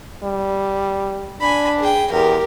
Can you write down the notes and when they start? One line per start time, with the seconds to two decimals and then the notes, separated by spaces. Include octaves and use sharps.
0.24 G3
1.41 D4 G#5 B5
1.80 G#4 G5
2.12 E2 G4 A#4